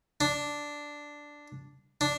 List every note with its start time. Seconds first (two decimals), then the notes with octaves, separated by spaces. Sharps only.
0.21 D4
2.01 D4